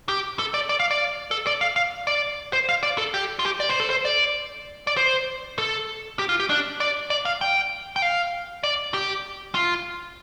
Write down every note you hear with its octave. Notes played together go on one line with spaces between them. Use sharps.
G4
A4
D5
D5
F5
D5
A4
D5
F5
F5
D5
C5
F5
D5
A4
G4
F4
G4
D5
C5
A4
C5
D5
D5
C5
A4
G4
F4
G4
D4
D5
D5
F5
G5
G5
F5
D5
G4
F4